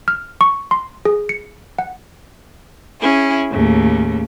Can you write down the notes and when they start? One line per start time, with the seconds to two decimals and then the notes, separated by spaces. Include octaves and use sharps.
0.08 F6
0.41 C#6
0.71 C6
1.05 G#4
1.29 C#7
1.79 F#5
3.01 C#4 E4 G#4
3.50 D#2 A2 C#3